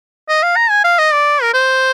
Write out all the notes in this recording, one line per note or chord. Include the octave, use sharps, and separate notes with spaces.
D#5
F5
A#5
G#5
F5
D#5
D5
A#4
C5